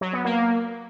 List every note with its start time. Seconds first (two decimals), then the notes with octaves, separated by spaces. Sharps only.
0.01 F#3
0.13 B3
0.25 A#3